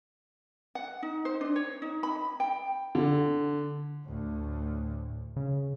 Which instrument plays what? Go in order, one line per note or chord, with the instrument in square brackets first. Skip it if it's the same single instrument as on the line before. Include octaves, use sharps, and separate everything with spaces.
[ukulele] F#5
D#4
C5
D4
C#5
D#4
B5
G5
[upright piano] D3
[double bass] D2 A2
[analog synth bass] C#3